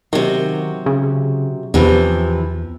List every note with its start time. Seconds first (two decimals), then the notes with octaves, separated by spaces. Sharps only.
0.13 C3 D#3 F#3
0.86 C#3
1.74 E2 C3 E3 F3